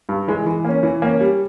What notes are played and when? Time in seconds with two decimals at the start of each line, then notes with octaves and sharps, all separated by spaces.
0.09 G2
0.28 E3 G#3
0.46 E3
0.65 A#3 C#4
0.83 E3
1.02 A#3 C#4
1.21 G3